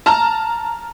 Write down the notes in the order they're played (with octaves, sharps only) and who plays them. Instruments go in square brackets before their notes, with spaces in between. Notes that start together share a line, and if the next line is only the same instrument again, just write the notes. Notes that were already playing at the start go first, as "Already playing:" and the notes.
[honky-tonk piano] A5 A#5 F6